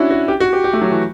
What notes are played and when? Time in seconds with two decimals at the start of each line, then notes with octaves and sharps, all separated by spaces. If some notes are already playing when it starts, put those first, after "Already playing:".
Already playing: C#4 D4 E4 F#4
0.11 F#4
0.28 G4
0.40 F#4
0.53 G4
0.64 G4
0.73 A3
0.81 F#3
0.91 E3